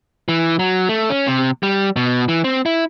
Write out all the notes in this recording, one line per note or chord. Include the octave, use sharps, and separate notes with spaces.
E3
F#3
A3
C#4
C3
G3
B2
E3
C4
E4